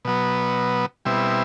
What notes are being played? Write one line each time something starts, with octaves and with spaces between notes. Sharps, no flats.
B2 F#3 B3
B2 G3 C4 E4